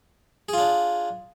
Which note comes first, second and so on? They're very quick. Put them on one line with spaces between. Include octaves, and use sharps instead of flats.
G#4 F4 D4